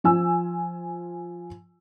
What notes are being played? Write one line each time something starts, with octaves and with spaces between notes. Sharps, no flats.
F3 F4 G#5 E6